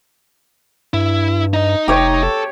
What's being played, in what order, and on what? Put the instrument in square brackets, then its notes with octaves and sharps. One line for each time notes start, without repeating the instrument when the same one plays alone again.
[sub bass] G2 [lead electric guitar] E4
[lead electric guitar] D#4 D#5
[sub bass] F1 [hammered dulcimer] G4 C#5
[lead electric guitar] A4